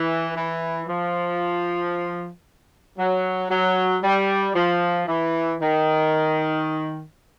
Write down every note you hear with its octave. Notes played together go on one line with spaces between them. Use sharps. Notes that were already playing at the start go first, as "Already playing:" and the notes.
Already playing: E3
E3
F3
F#3
F#3
G3
F3
E3
D#3